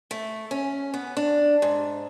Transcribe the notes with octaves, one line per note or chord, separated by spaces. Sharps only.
A3
C#4
B3
D4
G#2